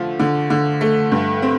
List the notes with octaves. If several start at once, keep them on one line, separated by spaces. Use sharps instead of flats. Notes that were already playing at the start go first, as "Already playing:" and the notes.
Already playing: D3 F3 A3
D3
D3
A3
G2
C4